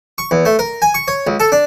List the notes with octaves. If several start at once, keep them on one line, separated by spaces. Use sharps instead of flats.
C#6
E2
A3
A#4
G#5
C#6
C#5
C#2
A4
D4